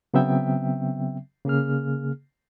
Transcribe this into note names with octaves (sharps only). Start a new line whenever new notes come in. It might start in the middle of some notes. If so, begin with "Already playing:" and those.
C#3 F#3 B3 C4 E5 G5
C#3 A#3 G#4 F6